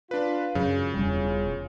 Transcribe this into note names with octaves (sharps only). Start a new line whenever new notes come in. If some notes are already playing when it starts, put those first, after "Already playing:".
D4 F4 B4
F#2 C#3
E1 G3 C#4 F4